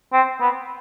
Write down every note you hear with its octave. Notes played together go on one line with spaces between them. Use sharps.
C4
B3